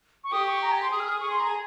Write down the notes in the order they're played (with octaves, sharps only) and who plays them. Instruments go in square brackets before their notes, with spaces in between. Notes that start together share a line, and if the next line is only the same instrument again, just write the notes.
[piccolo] C#6
[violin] G4 [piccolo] D#6
[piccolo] C#6
A#5
G#5
C6
[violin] G#4 [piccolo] D#6
[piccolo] F6
D#6
[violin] G#4 [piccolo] C#6
[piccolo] C6
A#5
G#5